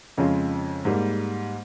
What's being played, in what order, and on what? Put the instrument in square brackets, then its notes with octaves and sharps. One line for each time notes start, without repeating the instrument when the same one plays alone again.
[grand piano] F2 C#3 G#3 C#4 F4
G#2 G3 A#3